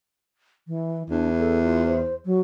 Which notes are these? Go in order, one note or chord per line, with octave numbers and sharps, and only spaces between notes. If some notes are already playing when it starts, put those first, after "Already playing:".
E3
E2 D4
A4
F4
C5
F#3